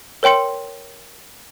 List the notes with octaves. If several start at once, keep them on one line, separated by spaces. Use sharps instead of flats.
A#4 C#5 G5 C6 C#7